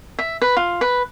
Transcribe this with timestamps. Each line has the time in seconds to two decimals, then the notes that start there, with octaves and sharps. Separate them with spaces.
0.19 E5
0.42 B4
0.57 F4
0.81 B4